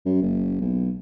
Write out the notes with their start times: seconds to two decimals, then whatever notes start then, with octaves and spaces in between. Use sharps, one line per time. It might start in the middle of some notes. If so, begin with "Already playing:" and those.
0.05 F#2
0.22 F#1
0.61 B1